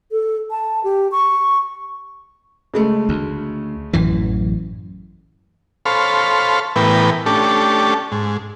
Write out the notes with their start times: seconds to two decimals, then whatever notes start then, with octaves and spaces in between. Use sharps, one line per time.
0.12 A4
0.51 A5
0.84 G4
1.12 C#6
2.74 C#3 G#3 A3
3.09 D2
3.93 A1 F#2 E3
5.86 A4 C5 C#5 F5 B5
6.76 A2 E3 B3 A#4 B4 G5
7.26 A3 C#4 D4 G4 A4
8.12 G#2